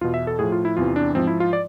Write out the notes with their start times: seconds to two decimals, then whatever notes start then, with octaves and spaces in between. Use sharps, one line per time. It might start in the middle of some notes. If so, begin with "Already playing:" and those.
0.01 E2 B2 F4
0.14 E5
0.27 A4
0.39 A2 F3 G#4
0.52 F4
0.65 E4
0.77 E2 C3 E3 F4
0.96 D4
1.15 G#2 F3 C4
1.27 E4
1.40 F4
1.53 D5